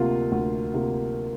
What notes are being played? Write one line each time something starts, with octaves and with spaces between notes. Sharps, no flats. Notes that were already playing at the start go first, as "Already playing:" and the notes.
Already playing: D2 C3 A#3 F4
D2
C3 A#3 F4